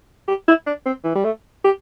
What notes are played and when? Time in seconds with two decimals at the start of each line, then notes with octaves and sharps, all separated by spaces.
0.28 G4
0.48 E4
0.66 D4
0.86 C4
1.04 E3
1.15 G3
1.25 A3
1.64 G4